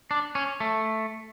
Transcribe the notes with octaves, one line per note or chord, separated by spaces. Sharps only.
D4
C#4
A3